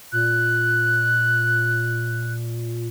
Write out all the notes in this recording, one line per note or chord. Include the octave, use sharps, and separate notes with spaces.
A#2 F#6